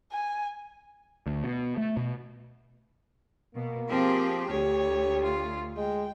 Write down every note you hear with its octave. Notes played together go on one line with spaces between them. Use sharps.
G#5
D2
B2
A3
B2
B2 A#3
F3 C4 G4 G#4
D2 G4 C#5
F4
G#3 G5